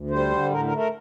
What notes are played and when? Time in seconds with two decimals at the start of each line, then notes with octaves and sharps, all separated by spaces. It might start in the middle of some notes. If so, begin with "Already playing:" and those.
Already playing: D2
0.10 G3 C5
0.31 D3
0.51 A2 A#4
0.65 A#4
0.71 A3
0.78 A#4